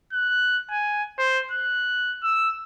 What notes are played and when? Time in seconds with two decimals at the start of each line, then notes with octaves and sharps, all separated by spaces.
0.13 F#6
0.71 G#5
1.18 C5
1.51 F#6
2.23 E6